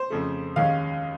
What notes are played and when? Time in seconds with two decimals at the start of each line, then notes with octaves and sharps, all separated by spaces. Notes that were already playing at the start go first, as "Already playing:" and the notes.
Already playing: C5
0.10 F2 C#3 F3 A3
0.56 D#2 D#3 G#3 C#4 F5